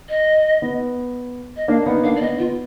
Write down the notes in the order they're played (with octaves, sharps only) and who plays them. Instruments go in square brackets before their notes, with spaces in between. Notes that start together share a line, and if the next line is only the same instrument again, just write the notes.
[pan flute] D#5
[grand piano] B3
[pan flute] D#5
[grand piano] A#3 D4 [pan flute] F5
[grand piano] B3 D#4 [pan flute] F#5
[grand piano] A#3 D4 [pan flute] F5
[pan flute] D5
[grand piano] B3 [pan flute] D#5
[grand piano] B3 [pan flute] F4